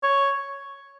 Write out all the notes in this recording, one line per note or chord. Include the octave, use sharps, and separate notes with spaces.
C#5